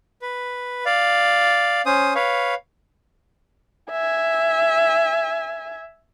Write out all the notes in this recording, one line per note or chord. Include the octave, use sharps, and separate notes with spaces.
B4
D5 F5
C#4 C5 D#6
B4 C#5 F5
E5 G#5